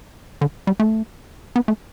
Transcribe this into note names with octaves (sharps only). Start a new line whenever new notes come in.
D3
G3
A3
B3
A3